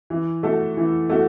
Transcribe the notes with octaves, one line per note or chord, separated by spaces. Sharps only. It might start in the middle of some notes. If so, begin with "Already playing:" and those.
E3
A3 F#4 A4
E3
A3 F#4